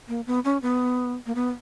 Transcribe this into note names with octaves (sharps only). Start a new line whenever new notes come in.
A#3
B3
C#4
B3
A#3
B3